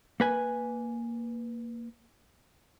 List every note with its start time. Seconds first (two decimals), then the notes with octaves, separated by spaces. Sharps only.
0.20 A#3 B4 G#5